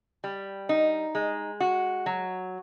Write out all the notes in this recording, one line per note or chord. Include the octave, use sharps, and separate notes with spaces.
G3
D#4
G#3
F#4
F#3